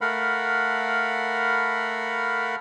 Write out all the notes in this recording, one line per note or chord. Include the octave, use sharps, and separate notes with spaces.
A3 A#4 F5 F#5 B5